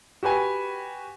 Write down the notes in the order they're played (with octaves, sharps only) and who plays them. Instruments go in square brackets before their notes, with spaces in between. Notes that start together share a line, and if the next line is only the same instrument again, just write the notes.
[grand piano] F#4 G4 B4 G#5